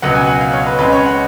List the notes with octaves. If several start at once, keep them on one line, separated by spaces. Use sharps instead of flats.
C#2 B2 F#3 B3 F#5
G#5
F#5
F5
C#5
B4
C#2 C#3 G#3 B4
C#5
F#5